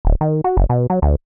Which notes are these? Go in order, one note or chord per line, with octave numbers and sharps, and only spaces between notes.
D1
D#3
F#4
F#1
B2
F#3
D2